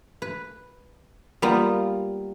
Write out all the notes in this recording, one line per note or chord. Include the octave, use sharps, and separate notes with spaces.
B4
G3 A#3 B3 F4